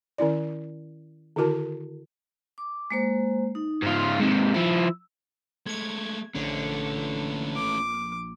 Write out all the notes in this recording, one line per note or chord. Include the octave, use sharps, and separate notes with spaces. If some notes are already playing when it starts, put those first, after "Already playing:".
D#3 C#4 E4 D5
D3 D#3 E4 F#4 A#4 A5
D6
G#3 A#3 C5
D#4
G#2 F4
G#2 C3
F3 E4 E6
G#3 A3 G#6
A#1 D3 A3 C#4
D6